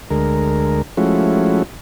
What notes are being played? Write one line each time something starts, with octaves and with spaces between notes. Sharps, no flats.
D2 G#3 A#4
F3 G#3 A3 C#4 E4 F#4